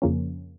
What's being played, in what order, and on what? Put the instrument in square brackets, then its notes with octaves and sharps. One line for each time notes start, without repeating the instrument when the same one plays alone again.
[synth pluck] F2 C#3 F3 A#3 C#4